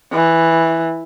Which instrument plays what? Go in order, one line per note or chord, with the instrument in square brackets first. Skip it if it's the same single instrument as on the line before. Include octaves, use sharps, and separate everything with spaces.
[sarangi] E3